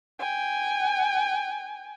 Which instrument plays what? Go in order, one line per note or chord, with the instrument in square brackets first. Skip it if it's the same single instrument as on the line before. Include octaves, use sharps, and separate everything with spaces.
[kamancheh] G5 G#5